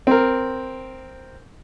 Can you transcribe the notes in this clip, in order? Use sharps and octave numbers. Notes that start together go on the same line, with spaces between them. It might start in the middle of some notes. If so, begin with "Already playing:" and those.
C4 A#4